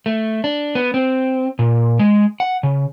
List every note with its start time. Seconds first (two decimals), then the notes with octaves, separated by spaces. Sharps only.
0.06 A3
0.44 D4
0.75 B3
0.94 C4
1.59 A#2
1.99 G#3
2.40 F#5
2.63 C#3